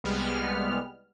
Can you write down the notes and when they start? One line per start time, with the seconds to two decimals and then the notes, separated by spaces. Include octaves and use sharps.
0.04 C2 G3 G#3 B3 F6